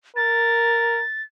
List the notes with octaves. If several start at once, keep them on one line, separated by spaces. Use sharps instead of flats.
A#4 A6